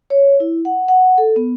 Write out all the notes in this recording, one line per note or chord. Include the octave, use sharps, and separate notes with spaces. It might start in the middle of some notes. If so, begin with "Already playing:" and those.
C#5
E4
F#5
F#5
A4
B3